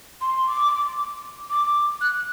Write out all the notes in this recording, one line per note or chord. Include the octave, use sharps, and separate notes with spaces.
C6
D6
D6
F#6